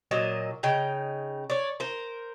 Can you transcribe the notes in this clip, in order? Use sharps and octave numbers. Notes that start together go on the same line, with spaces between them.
A#2 F#3 D#5
C#3 D#4 G5
C#5 D5
A#4 C5